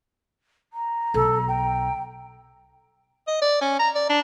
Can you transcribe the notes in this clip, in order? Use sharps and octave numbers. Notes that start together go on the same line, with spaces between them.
A#5
B1 A4
G5
D#5
D5
C#4
A#5
D5
D4